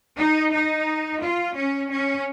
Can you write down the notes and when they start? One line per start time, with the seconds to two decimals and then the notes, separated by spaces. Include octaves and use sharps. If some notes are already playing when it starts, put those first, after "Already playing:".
0.17 D#4
0.52 D#4
1.21 F4
1.54 C#4
1.89 C#4